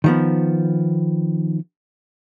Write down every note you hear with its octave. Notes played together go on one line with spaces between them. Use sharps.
D#3 F3 B3